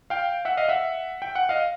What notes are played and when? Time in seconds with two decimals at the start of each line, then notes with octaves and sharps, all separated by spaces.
0.10 F5 G5
0.45 E5 F#5
0.57 D#5 F5
0.68 E5 F#5
1.22 G5
1.35 F#5
1.49 D#5 F5